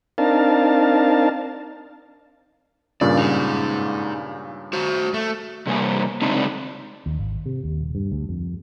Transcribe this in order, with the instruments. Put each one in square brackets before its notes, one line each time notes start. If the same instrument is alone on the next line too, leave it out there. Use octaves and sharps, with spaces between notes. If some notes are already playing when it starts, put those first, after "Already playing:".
[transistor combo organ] C4 D4 D#4 A#4 F5 A5
[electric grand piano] G2 A#2 C#3 [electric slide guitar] D5
[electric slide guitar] D#4 G#4
F#4 C5
A3
C3 G3 A#3 G#5
C#3 G#3 C4 D4 D#4
[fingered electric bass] D#2
G#1
C3
D#2
D#1
G2
D2
F2